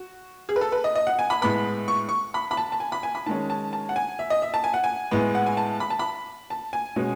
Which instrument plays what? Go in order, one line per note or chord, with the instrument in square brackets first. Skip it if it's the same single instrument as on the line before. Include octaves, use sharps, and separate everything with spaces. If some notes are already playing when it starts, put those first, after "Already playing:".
Already playing: [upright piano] F#4
G#4
B4
A4
B4
D#5
D#5
F#5
G#5
B5
A2 G#3 B3 B5
C#6
C#6
B5
B5
A5
A5
G#5
B5
G#5
B5
D#3 G#3 C#4 A5
A5
A5
F#5
G#5
E5
D#5
E5
A5
G#5
F#5
G#5
A2 G#3 B3
F#5
G#5
A5
B5
A5
B5
A5
G#5
B2 G#3 C#4